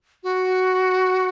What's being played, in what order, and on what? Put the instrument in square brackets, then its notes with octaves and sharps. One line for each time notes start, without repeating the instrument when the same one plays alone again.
[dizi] F#4